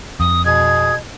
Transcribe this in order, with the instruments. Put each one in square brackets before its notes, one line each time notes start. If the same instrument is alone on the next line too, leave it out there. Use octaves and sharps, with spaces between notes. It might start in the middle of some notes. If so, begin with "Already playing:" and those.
[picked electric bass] F2 [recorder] D#6
[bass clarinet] B2 [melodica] G#4 [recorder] G#6